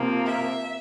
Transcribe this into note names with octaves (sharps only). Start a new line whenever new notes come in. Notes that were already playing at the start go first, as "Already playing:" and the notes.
Already playing: C3 F3 A#3
E5